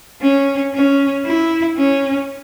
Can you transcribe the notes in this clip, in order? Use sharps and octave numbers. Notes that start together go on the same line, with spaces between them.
C#4
C#4
E4
C#4